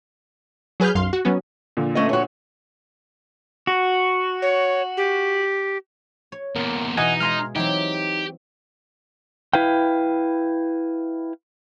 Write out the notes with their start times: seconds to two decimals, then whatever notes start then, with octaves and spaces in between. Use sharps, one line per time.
0.80 F#3 G#4 B4 F6 G6
0.95 B1 F#2 F5 C6
1.13 F#4
1.25 F#3 B3 C#4
1.77 A#2 D3 F3
1.95 A3 C#4 D#5
2.09 F#4 C#5
3.67 F#4
4.42 C#5
4.97 G4
6.32 C#5
6.56 E2 A#2 A#4 C6
6.97 B2 E3 D#4 D#5 F#5 G#5
7.20 G#3 G#4 F5 A#5 C6 F6
7.55 E3 F#3 C4 D#4 G4
9.53 E4 B4 F5 G5